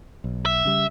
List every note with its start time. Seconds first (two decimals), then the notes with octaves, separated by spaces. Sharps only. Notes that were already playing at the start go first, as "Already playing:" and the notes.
0.24 B1
0.46 E5
0.65 C#3 G3